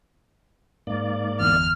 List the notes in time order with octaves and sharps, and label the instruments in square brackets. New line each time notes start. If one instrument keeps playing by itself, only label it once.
[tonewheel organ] G#2 A#3 D5
[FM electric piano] G1 E2 [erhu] F6